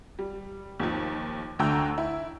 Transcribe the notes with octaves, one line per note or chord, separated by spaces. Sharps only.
G3
D#2 D#3 F3
D2 D3 A3 G5 A#5 E6
E4